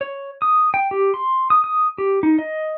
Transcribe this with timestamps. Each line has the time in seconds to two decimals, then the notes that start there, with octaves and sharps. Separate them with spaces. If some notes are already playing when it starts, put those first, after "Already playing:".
0.01 C#5
0.42 D#6
0.74 G5
0.91 G4
1.14 C6
1.50 D#6
1.64 D#6
1.98 G4
2.23 D#4
2.39 D#5